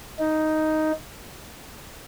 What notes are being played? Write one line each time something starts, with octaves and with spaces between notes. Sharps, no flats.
D#4